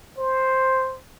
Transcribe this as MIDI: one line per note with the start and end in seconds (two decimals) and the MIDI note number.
0.18 0.98 72